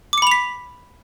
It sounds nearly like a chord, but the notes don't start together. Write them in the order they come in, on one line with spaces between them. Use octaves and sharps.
D6 C#7 B5 F7 B6